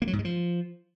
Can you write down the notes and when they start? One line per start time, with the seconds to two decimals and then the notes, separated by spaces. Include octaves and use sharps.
0.02 A#3
0.07 F#3
0.13 G#2
0.19 G#3
0.25 F3